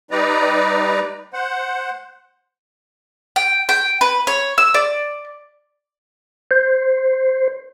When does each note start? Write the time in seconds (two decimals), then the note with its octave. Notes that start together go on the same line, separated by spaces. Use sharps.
0.11 G3 D#4 B4 D5 A#5
1.33 C5 F#5
3.36 G5
3.69 G5
4.01 B4
4.27 C#5
4.58 E6
4.74 D5
6.51 C5